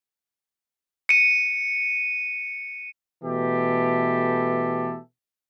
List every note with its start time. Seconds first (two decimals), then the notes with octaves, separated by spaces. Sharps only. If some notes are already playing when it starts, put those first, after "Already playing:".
1.09 C#7 D#7
3.23 B2 E3 A3 G4 A4